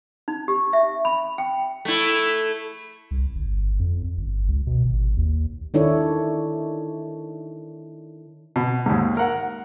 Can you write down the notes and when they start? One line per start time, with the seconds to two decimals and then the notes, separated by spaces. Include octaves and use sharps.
0.28 D#4
0.48 G4
0.73 E5
1.05 B5
1.38 G5
1.85 A3 E4
3.11 C2
3.35 G1
3.80 F2
4.18 G1
4.48 C#2
4.67 B2
4.84 G#1
5.17 D#2
5.74 D#3 D4 E4 A4 C#5
8.56 B2
8.86 D#2 G#2
9.17 A#4 F#5